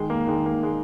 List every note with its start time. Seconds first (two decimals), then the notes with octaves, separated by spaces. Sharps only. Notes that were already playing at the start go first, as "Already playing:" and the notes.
Already playing: D#3 G#3
0.10 A#3
0.27 D#3 G#3
0.46 A#3
0.63 G#3